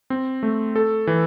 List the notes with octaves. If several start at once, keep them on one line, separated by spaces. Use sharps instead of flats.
C4
A3
A4
E3